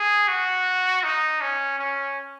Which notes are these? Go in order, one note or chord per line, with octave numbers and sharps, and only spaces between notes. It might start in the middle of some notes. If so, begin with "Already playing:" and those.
Already playing: G#4
F#4
D#4
C#4
C#4